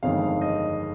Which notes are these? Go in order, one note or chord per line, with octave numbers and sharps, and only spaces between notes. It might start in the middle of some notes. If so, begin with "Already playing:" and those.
G1 F2 D#3 G#3 F5
D#5